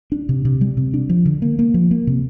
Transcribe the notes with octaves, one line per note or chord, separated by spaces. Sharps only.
D4
C3
C3
G3
C3
D4
F3
D3
A#3
A#3
F3
A#3
C3